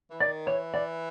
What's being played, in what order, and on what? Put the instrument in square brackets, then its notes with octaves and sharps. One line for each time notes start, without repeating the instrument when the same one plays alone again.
[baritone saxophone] E3
[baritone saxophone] D#3 [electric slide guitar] D5
[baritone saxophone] E3 [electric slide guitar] C#5
[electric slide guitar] D5